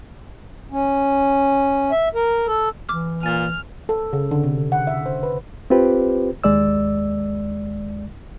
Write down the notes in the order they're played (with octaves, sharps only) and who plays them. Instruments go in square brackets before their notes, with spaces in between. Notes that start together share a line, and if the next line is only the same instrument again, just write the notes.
[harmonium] C#4
E5
A#4
A4
[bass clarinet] E3 [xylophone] D6 F6
[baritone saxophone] A#2 [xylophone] G#5 A6 [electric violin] F6
[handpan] A4
C#3
D3
C3
F#5
E5
C5
B4
[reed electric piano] C4 F4 G4 B4 C5
D#2 G#3 D5 E6